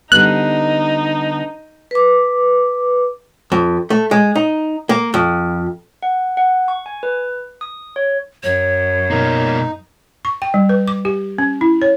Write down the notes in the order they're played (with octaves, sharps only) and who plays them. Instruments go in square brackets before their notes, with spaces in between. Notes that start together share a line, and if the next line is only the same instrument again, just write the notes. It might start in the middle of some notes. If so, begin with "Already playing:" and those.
[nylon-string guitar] D3 G3 B3 [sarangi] D#4 [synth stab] F#6
[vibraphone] B4 D6
[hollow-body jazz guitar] F2
A3
G#3
D#4
A#3
F2
[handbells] F#5
F#5
C#6
G#5
B4
D#6
C#5
[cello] F#2 [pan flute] C#5
[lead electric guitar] B2 A#3 [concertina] D#4
[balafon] C#6
G5
G3
B4
D6
G4
C#4
E4
C#5